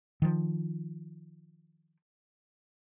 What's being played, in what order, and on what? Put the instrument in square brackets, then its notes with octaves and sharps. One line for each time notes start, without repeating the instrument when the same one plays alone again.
[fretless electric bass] D#3 F3